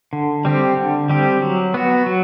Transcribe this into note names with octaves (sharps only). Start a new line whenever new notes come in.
D3
G3 C4 G4
D3
G3 C4 G4
F#3
B3 F#4
F#3